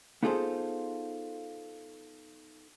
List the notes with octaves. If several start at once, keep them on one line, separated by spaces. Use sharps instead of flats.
B3 D#4 F4 G#4 A4 C5